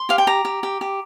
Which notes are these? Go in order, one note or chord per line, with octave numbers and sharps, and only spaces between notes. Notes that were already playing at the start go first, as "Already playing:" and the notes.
Already playing: C6
G4 F5
G5
G4 A#5
G4
G4
G4